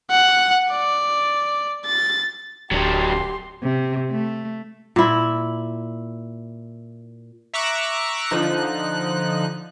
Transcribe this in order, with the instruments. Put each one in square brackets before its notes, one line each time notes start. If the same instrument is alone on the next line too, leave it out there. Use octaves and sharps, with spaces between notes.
[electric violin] F#5
D5
A6
[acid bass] D1 [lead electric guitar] F#3 D4 [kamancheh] G4 C6
[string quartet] C3
A3
[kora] A#2 E4
[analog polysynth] E5 A#5 C#6 D6 E6 F#6
D3 F3 D#4 F#6